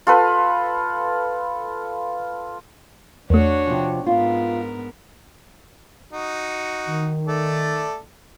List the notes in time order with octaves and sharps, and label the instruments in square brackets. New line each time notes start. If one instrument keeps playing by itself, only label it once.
[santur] F4 A4 B4
[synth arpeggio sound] E2 A3 [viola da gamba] D4 F#4 C#5
[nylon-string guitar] C3 F3
[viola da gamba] G#2 B3 A#4 [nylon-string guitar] F4
[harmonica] D#4 F#4
[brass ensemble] D#3
[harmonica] A3 A4 D5